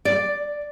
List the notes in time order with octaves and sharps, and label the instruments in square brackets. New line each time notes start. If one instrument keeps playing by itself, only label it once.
[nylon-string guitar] D5